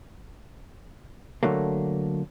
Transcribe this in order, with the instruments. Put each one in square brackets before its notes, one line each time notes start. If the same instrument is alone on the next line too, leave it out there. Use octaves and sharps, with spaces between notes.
[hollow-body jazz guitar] D3 F#3 A3 A#3